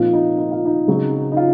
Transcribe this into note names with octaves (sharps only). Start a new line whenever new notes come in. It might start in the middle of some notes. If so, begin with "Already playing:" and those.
Already playing: A#2 F3 C4 D#4 F4
D#4
D#4
F4
D#4
C#3 F#3 C4 D#4
D#4
F4